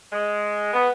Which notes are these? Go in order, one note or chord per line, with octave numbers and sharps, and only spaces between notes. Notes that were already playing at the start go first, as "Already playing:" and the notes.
G#3
B3